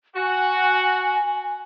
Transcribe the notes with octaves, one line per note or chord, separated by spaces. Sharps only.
F#4 G#5